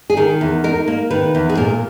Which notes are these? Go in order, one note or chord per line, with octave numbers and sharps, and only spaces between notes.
G#4
D#3 A#4
E2
D#4 A#4
A#3
D#3 B4
E2
G#4
A#2 A#4